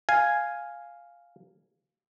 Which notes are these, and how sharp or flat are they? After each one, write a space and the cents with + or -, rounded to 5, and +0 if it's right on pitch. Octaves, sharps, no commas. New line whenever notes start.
F5 +0 G#5 +0